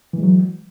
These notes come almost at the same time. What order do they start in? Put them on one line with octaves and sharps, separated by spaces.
E3 G#3 F#3